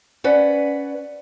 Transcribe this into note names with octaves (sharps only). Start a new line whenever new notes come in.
C#4 B4 D5 F#5